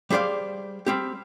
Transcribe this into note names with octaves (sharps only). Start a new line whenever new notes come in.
G3 G#4 C5 D5 F5
G3 C4 G4